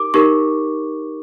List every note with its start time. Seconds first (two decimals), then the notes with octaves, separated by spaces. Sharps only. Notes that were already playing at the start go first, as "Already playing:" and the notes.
Already playing: D#4 G4 A#4 D6
0.14 D#4 G4 A#4 C#6